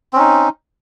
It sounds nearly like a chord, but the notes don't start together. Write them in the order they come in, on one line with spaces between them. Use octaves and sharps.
C4 C#4 D#4